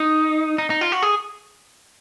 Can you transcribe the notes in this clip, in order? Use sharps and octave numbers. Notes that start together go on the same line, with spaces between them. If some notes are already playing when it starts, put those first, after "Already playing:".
Already playing: D#4
D#4
D#4
F4
F#4
G#4